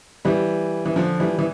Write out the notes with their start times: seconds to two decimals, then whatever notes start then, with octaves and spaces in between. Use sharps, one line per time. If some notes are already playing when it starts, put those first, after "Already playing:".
0.25 E3 G3
0.86 E3
0.96 D3 F3
1.20 E3 G3
1.39 E3